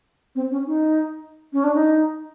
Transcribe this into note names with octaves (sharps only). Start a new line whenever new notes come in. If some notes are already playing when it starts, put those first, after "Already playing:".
C4
C#4
D#4
C#4
D4
D#4